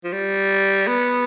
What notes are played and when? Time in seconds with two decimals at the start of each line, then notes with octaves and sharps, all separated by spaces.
0.04 F3
0.13 G3
0.87 B3